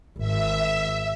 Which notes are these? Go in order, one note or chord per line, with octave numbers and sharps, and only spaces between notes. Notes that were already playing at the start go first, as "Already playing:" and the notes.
G#1 E5